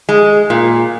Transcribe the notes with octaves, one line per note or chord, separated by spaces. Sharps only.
G#3
A#2